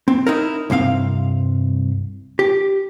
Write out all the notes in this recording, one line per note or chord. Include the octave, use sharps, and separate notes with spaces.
C4
D#4 E4 A#4
C2 G2 C4 F5
G4